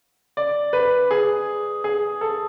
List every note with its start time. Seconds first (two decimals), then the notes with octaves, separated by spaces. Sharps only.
0.37 D5
0.73 B4
1.11 G#4
1.84 G#4
2.21 A4